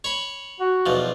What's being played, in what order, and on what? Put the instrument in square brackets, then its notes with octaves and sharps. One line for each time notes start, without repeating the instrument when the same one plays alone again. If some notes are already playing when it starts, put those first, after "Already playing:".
[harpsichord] C#5 B5
[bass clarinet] F#4
[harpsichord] B1 E2 F3